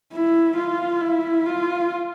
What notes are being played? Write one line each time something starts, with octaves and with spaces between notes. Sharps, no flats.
E4
F4
E4
F4